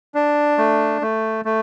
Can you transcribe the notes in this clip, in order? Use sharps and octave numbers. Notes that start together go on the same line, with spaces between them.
D4
A3
A3
A3